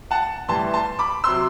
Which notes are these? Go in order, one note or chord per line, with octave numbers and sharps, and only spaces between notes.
F#5 A5
A2 E3 G3 A5 C6
A5 C6
B5 D6
C3 F#3 C6 E6